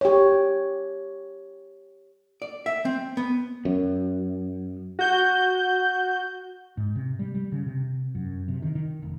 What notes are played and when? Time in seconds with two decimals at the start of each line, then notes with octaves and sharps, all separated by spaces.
0.01 G4 C#5
2.42 D5
2.66 E5
2.85 C4
3.17 B3
3.65 F#2
4.99 F#4 G6
6.77 G#2
6.96 C3
7.19 G3
7.35 G3
7.52 C#3
7.66 C3
8.15 F#2
8.48 C3
8.62 D#3
8.75 D#3
9.02 F1